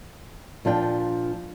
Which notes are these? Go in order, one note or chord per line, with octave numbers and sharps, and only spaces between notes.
A#2 F3 D4 G5